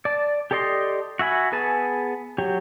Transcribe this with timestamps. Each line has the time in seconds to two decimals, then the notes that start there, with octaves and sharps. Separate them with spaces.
0.05 D5 A5
0.51 G4 A4 D5 D#5 C6
1.19 F#4 E5 G#5 B5
1.52 B3 G#4 B4 G#5 A5
2.38 F#3 G4 C#5